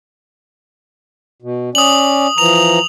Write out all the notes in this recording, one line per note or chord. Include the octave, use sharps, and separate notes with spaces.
B2
C#4 D5 D#6 F#7
E3 F3 A#5 F7